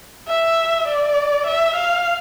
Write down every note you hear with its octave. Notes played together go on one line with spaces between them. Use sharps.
E5
D5
E5
F5